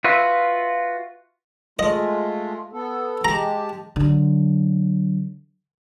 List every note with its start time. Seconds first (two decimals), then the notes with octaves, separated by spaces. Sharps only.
0.04 F4 F#4 B4 E5
1.79 G#3 A3 F4 D#5
2.73 B3 A4
3.25 G#3 G4 A5 A#5
3.96 D3 F#3